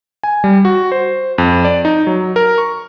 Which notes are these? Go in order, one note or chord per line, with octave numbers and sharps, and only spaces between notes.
G#5
G3
F#4
C5
F2
D5
D#4
F#3
A#4
C#6